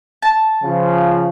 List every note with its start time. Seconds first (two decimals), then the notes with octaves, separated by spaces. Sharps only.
0.22 A5
0.62 C#3 F3